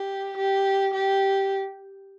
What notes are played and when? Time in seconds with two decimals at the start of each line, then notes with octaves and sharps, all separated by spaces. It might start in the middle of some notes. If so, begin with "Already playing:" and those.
Already playing: G4
0.37 G4
0.94 G4